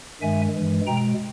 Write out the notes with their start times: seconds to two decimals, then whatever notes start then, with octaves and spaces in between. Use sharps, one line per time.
0.21 G2 D#3 G#3 E5 G#5
0.54 G2 E3 G#3
0.87 B2 G#3 G5 A#5